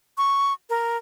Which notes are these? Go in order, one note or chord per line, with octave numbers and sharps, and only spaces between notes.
C#6
A#4